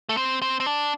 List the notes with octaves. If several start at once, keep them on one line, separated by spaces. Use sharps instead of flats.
A3
C4
C4
C4
D4